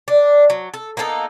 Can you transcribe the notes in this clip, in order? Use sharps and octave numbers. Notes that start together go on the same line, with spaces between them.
D4
F#3
A4
A#3 B3 D#4 A4